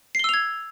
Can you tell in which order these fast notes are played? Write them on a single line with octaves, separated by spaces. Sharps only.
C7 G7 E6 F7 G#6